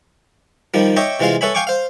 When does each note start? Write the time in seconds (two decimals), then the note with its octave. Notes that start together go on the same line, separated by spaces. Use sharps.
0.74 D#3 F3 G3
0.96 C#5 D#5 E5 G5 C#6 D6
1.20 C3 E3 G#3 F4 F5
1.41 A4 B4 C#5 E5 G#5 B5
1.54 F5 G5 G#5 C#6 D6
1.67 C5 F5